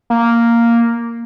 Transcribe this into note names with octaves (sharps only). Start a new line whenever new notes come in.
A#3